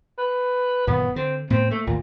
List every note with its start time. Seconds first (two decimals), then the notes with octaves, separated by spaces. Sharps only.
0.18 B4
0.87 F#1 A#2 D#3 B3
1.16 D3 C4
1.50 A2 B3 C4
1.71 A3 A#3
1.87 G#1 D2 A#2